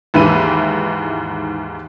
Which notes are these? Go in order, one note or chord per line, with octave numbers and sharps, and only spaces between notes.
D#2 G#2 E3 E5 B5 D#7